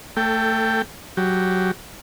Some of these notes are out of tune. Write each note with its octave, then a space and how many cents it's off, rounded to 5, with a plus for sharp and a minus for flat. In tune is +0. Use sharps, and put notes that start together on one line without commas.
A3 +25 A4 +0 G5 +0
F#3 +5 G4 +0